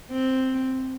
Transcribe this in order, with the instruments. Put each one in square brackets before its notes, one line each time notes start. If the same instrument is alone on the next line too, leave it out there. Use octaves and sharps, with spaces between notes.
[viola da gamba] C4